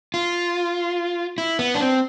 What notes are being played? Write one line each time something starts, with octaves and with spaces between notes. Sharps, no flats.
F4
E4
B3
D4
C4